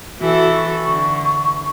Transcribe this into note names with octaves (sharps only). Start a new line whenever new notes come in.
E3 F#4 A4
C#6
D3